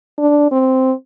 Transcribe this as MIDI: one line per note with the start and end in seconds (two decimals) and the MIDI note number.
0.18 0.48 62
0.51 0.92 60